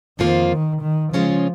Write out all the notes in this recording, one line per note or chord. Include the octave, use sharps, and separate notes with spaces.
F2 D#3 F3 A#3 F4
D#3
D#3
C#3 F3 G#3 C#4 F4